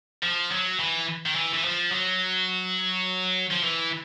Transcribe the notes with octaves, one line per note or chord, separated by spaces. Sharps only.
F3
F#3
E3
D#3
E3
E3
F3
F#3
F3
E3